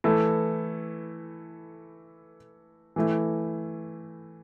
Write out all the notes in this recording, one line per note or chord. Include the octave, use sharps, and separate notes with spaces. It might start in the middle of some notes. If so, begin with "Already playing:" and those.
E3 A3 E4 A4
E3 A3 E4